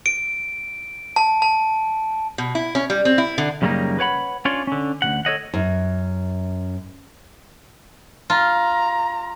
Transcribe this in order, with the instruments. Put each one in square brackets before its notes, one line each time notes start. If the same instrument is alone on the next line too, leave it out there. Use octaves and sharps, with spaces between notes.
[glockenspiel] D7
A5
A5
[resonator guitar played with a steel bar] B2
E4
C#4
G3
C4
E4
D3
[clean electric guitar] F#2 C#3 G3 A3 A#3 D#4
B4 C#5 F#5 B5
C#4 D4 F4 C#5 D5
D3 C#4
D2 C#3 F#5
A4 C#5 D#5 F#5
[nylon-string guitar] F#2
[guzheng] F4 [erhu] A#5